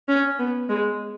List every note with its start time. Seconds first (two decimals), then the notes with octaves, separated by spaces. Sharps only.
0.08 C#4
0.39 B3
0.69 G#3